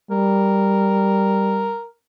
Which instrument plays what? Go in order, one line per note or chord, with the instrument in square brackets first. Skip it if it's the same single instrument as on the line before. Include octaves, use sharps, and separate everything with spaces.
[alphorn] G3 [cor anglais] A#4